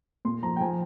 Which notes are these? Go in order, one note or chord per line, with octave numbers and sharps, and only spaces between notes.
A#2 C6
F3 A#5
G5
F3 G#5